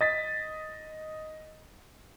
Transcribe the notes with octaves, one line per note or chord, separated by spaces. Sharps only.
D#5 A6 B6